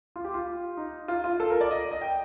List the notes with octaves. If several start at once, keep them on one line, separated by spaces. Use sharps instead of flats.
F4
G4
F4
D#4
F4
F4
A4
A#4
D5
D#5
D#5
G5